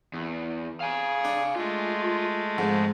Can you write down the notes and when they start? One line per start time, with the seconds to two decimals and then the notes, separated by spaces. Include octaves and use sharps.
0.13 E2
0.80 G#4 F5 G#5
1.25 D4
1.56 G#3 A3 F4
2.58 F2 G#2 F3